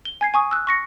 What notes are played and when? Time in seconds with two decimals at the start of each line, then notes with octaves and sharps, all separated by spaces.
0.05 G7
0.21 G#5 G#6 C7
0.34 G#5 C#6 D#6
0.51 E6 F#6
0.67 C#6 A#6 C#7